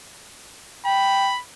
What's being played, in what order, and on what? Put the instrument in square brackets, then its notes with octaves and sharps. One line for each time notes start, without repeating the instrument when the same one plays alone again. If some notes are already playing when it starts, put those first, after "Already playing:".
[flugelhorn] G5 [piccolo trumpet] B5